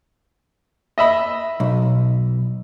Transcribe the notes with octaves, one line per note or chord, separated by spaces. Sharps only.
D#5 E5 B5
B1